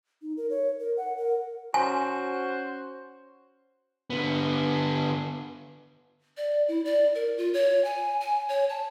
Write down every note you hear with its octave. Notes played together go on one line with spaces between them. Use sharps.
D#4
A#4
C#5
A#4
F#5
A#4
C#4 F#4 C5 G#5
D3 B3
D5
E4
D5
A#4
F4
C#5
G#5
G#5
C#5
A5